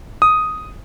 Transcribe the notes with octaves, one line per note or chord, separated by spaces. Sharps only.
D#6